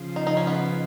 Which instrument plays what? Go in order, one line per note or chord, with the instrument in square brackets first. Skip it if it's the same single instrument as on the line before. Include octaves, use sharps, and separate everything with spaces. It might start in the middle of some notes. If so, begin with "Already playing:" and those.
Already playing: [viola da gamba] C#3 F3
[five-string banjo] D#4
D#4
C#4
B3